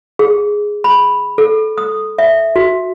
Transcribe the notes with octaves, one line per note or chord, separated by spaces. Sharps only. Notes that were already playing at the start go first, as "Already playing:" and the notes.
G#4
B5
A4
D#6
E5
F#4